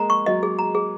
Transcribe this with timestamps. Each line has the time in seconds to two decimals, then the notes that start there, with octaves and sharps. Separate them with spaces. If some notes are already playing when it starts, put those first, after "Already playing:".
Already playing: G#3 A#3 A#5
0.10 C#6
0.26 F#3 D#5
0.43 G#4
0.59 A#5
0.75 G#4